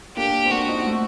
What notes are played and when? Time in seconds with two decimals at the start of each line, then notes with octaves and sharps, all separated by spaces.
0.17 A#3 D4 G4
0.45 C4
0.51 A#3 D4 F#4
0.69 C4 D#4
0.86 A3 C4